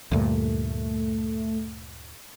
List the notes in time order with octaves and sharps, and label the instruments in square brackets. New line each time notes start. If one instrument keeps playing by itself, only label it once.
[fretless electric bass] D2 G2 A#2 [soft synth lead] A3